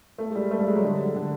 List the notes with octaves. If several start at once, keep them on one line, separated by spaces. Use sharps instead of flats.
A3
G#3
G3
A3
G3
G#3
F#3
D3
D3